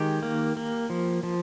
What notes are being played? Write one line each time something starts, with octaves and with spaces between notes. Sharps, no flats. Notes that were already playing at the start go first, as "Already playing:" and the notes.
Already playing: D#3 G#3 G4
A#3
A#3
F3
F3